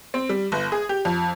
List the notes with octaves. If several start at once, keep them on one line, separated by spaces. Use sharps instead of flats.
C4
G3
G1
G#4
G4
F2